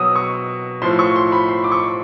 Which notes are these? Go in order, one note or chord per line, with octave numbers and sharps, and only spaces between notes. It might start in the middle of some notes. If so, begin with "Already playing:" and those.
Already playing: B2 F#3 D#6 E6
C#6
A2 F3 C6
C#6
C6
B5
C6
D6
C#6